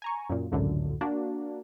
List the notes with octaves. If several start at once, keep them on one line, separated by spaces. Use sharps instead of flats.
G#5 A#5 C#6
F#2 A#2
G#1 C#2 F#2 A2 D3
A#3 D4 F#4